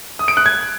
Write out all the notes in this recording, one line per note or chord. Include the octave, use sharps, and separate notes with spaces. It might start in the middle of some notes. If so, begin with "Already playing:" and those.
D#6
D7
F#6
G#6